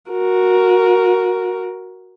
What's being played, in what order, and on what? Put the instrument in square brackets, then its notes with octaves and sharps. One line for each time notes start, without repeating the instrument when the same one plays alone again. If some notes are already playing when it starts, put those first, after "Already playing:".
[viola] F#4 A#4